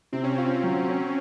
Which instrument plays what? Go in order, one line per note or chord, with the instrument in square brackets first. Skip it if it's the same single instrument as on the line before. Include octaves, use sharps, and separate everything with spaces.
[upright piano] C3 [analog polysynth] C4
[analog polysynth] C#4
[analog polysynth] C4 [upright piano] F4
[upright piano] F#3
C#4